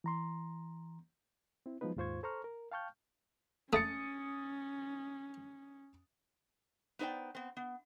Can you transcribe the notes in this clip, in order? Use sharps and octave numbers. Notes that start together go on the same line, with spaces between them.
E3 A#5 C6
C4 E4
F3 F#3 G#3 B3 D#4 B4
D#2 G#2 F4 C5 C#6 G#6
A4 C5 A#5 C#6 F6
A#4
F5 G5 A5 C#6 F6 G6
A3 C#4 D#6 A6 C#7
B3 D#4 C5 D5 G5
B3 C4
B3